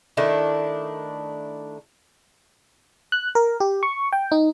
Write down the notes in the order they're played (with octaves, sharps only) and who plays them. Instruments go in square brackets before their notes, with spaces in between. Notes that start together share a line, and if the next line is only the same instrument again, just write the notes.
[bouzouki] D#3 A3 D4 E4
[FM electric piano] F#6
A#4
G4
C#6
G5
D#4